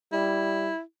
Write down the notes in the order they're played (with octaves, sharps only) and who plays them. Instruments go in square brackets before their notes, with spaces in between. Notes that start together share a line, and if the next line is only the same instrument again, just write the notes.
[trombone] G3 [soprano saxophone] E4